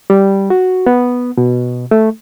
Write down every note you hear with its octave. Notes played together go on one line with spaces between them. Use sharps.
G3
F#4
B3
B2
A3